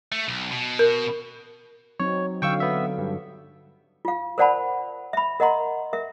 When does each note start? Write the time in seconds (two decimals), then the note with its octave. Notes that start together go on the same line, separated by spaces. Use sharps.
0.12 A3
0.28 B1
0.51 B2
0.79 A#4
2.00 F#3 C4 D#4 C#5
2.42 D3 F#3 F5 G5 C#6 E6
2.60 B3 E5
2.98 G2
4.05 F4 F5
4.38 A#4 C5 D5 F#5 A5 B5
5.13 E5 B5
5.40 A#4 D#5 F#5 A#5 C6
5.93 A#4 E5